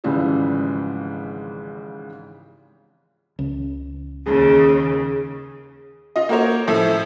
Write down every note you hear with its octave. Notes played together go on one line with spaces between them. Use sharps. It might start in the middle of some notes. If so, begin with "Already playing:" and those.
G#1 G#2 C#3 E3 F3 G3
C#2
D#2 C#3 G#4
F4 D#5
A#3 F#4 A#4 C5 C#5
A2 F3 E5